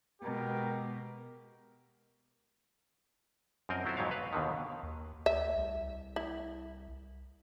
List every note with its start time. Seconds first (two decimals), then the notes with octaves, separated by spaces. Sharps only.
0.22 B2 G#3 G4 A#4
3.69 F#2 F3 C4 A#4 D#5
3.86 F#3 C4 E4 F4 A4 C5
3.97 F2 G#2 F#3 B3 C#5 F5
4.11 B4 F5
4.33 D#2 B2 D3 D#3
4.83 D#2
5.26 D2 E5
5.56 C2
6.16 E4